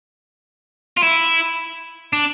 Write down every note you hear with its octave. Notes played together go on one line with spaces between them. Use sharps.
F4
E4
D4